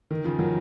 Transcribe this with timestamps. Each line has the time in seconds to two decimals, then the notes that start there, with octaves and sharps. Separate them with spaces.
0.11 D#3
0.25 C#3 F3
0.39 D#3 F#3